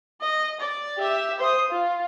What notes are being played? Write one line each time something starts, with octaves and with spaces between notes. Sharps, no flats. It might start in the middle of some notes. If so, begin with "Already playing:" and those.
D#5
D5
G4 E5
C5 D#6
F4